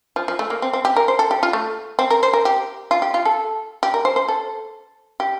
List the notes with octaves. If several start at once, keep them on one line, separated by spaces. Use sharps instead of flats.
F3
F3
A3
A#3
C4
C4
G4
A#4
C5
A4
G4
F4
A3
C4
A#4
C5
A#4
G4
F4
G4
F4
A4
G4
A#4
C5
C5
A4
G4